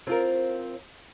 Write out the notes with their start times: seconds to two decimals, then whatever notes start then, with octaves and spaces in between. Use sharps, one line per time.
0.07 C4 F4 A#4